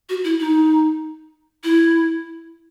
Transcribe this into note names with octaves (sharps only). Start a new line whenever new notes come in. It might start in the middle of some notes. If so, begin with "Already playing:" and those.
F#4
E4
D#4
E4